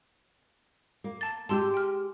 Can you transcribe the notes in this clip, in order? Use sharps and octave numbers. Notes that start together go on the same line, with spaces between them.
A#3
A5 A6
G#3 G4 A5 C6 E6
G5 F6